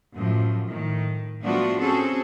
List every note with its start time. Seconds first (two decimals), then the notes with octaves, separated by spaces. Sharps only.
0.14 F#2 A2 F3
0.66 A2 D#3
1.42 F3 A3 B3 D4 F4 F#4
1.82 C4 C#4 F#4 G#4 A4